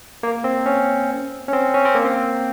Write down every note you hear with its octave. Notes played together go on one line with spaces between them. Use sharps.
A#3
C4
C#4
C#4
C4
C#4
C4
A#3
C4